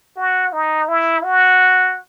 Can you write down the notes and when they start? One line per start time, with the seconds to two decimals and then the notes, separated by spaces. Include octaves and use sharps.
0.16 F#4
0.53 D#4
0.88 E4
1.23 F#4